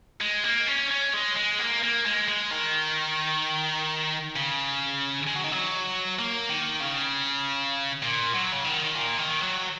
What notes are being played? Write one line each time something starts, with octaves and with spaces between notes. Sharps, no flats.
G#3
A#3
C#4
C#4
G#3
G#3
A#3
A#3
G#3
G#3
D#3
C#3
G#3
F#3
D#3
F#3
A#3
D#3
C#3
A#2
F#3
C#3
D#3
A#2
D#3
F#3